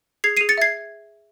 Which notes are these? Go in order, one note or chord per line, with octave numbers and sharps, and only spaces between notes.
G#4 G#6 C7
G#4 C7 D#7
A6 C#7
E5 G#6 C7